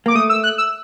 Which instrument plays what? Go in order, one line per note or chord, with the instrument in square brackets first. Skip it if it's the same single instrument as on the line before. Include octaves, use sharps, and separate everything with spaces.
[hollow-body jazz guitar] A#3 [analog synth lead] D6
[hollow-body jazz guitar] A3 [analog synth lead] D#6
[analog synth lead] E6
F#6
E6